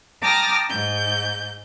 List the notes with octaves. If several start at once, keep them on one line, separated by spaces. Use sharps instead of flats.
G5 A5 A#5 D6 D#6 F6
G#2 G6